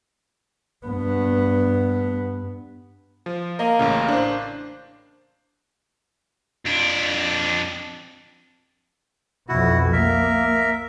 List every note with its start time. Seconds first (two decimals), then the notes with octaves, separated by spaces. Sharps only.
0.86 G2 B3
3.26 F3
3.59 A#3 D#5
3.79 A1 A2 C#3
4.08 D4 C5
6.65 F2 D4
9.49 B1 F2 B2 E4 F#4
9.93 A#3 A#4 E5